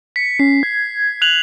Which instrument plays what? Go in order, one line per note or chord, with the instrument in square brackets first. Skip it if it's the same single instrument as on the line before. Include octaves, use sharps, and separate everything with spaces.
[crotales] B6 [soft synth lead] C#7
[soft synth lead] C#4 [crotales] C7
[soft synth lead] G#6
[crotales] F#6 F7 F#7